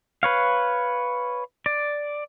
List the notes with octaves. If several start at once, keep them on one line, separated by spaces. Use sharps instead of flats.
B4 C#5 F5
D5